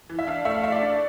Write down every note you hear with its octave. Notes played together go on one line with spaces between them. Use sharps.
E3
E5
D4 F5
A3 E5
F5
A3 E5
D5
D4